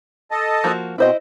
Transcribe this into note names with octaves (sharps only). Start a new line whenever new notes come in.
A4 D#5 A5
F3 A#3 F#4
B2 C4 E4 C5 D#5